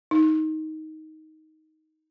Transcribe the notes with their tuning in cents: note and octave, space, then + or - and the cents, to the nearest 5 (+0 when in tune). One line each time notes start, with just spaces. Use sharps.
D#4 +10